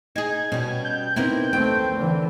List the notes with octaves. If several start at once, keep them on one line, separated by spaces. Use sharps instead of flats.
D#4 G#4 G#6
B2 G3 C#4
G6
C3 B3 C4 D#4 E4 A#4
D#2 A3 C4 G5
D3 E3